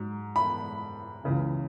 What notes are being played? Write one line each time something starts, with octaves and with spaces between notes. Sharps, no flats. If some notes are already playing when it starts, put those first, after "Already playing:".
Already playing: G#2 F#3
B5
C#2 C#3 E3